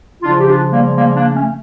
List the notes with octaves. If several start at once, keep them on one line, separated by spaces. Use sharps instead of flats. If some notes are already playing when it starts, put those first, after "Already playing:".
C#3 F3 D4 F4
G4
D4 F4
G3 A#3
G3 A#3
A#3 D4
A3 C#4